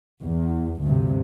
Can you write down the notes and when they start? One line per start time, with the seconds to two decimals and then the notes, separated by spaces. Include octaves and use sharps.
0.22 E2
0.81 D2 G2 C3